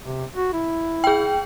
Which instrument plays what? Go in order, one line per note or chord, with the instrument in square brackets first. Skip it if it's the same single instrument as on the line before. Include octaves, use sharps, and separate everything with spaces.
[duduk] C3
F#4
E4
[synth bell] G#4 G5